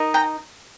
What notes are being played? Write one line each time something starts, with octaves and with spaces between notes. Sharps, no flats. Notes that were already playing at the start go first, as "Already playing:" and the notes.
Already playing: D#4 A#4 D#5
G5 A#5